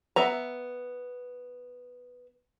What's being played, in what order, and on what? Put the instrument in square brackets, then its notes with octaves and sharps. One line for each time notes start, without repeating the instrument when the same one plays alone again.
[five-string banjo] B3 E5 A#5